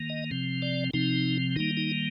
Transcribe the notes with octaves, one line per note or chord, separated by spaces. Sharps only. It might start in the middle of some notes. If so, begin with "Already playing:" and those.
Already playing: D#3 A#3
D#5
C3 F3 C4
D5
C3 F3 C4 D#4
D#3 G3 A#3 D#4
D#4